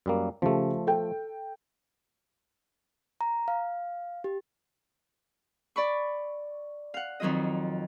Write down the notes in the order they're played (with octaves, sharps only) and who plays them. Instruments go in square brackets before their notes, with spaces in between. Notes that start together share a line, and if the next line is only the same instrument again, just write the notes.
[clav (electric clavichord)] F#2 G3 A#3
[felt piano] C#3 G4 [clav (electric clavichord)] F3 A3
[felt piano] A4 G5
[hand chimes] A#5
F5
G4
[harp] D5 B5 C#6
F5 F#5
F2 D#3 F#3 F4 D#5